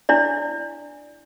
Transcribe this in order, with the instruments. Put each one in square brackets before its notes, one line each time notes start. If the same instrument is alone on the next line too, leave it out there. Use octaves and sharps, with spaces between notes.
[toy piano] D4 E4 D5